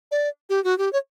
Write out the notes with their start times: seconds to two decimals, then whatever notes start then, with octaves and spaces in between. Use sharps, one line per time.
0.11 D5
0.50 G4
0.64 F#4
0.78 G4
0.93 C#5